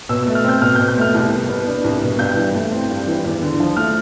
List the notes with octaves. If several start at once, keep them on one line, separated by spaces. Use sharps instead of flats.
B2 E6
A3 E6
F6
C4 G6
B2 F6
G6
B2
G6
A3 F6
C2
B2
B3
D4
C2
B2
G2 G6
E3
A3
C4
G2
E3
E2
D3
F3
A3 F6